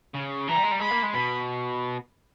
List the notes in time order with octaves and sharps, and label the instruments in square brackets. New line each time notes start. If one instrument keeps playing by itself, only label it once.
[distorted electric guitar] C#3
[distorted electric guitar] E3 [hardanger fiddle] A#5
[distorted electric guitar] G3
G#3
G3
[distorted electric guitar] G#3 [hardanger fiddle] B5
[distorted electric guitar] A#3
G#3
[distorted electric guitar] B2 [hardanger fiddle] B5